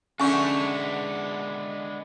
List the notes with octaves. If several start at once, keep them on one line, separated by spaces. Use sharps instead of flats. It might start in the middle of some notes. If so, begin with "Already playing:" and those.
D3 G#3 A3 B3 C#4 G#5 C#6